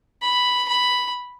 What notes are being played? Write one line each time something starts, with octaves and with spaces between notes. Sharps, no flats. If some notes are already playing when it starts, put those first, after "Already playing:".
B5
B5